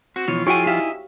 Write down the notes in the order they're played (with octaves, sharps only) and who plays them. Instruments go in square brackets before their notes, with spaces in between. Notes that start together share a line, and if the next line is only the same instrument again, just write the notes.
[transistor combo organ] C4 [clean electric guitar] F#4
[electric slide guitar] B2 E3 [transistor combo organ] F3 F4 [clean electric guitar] C#5
[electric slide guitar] E4 G#5 [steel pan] F#4 C#5 C#6 [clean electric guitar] G#4 G5
[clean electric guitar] D#4 E5 [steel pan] G4 F5